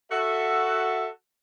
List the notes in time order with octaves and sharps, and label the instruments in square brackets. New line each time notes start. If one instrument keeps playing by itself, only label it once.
[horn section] F#4 A4 E5